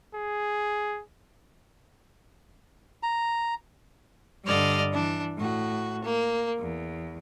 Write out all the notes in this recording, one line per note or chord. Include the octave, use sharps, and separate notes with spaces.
G#4
A#5
G2 D3 D5 D#5 F6
E3 D4
A2 F#4
A#3
E2